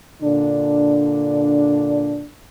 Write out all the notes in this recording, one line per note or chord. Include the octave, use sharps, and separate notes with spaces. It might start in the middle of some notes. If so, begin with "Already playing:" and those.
A#2 D3 D4